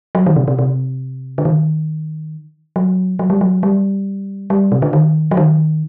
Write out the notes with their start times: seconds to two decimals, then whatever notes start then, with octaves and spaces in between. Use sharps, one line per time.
0.15 F#3
0.26 D#3
0.36 C3
0.48 C3
0.59 C3
1.38 D3
1.45 D#3
2.76 F#3
3.19 F#3
3.30 G3
3.41 F#3
3.63 G3
4.50 G3
4.72 C3
4.82 D3
4.93 D#3
5.31 F#3
5.37 D#3